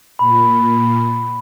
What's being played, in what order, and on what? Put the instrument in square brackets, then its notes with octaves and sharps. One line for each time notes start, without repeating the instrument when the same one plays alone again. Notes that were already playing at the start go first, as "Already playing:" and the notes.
[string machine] A#2 [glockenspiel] B5